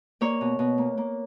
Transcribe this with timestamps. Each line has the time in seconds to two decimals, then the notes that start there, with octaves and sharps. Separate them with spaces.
0.21 A#3 C#5
0.41 B2
0.59 B2
0.78 A#3
0.98 A#3